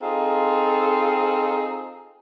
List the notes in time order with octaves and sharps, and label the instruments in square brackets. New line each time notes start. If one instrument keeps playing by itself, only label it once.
[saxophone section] C4 D#4 F4 G#4 A4